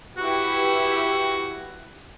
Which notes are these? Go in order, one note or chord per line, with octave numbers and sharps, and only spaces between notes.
E4 F#4 G4 B4